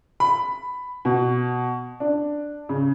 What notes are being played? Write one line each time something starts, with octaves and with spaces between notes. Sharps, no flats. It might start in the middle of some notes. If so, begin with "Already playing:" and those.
B5
B2
D4
C#3